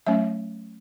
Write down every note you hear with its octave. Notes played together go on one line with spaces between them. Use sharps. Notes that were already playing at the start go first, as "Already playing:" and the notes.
F#3 A3 C#4 E5